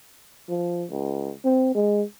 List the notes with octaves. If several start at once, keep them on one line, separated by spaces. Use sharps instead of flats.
F3
C#2
C4
G#3